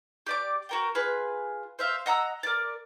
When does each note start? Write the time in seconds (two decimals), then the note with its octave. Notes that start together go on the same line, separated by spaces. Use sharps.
0.26 G4 D5 D6
0.69 F#4 A#4 G5
0.95 F4 G#4 B4
1.79 C5 E5 F5
2.06 D#5 F#5 A#5 E6
2.43 A#4 D5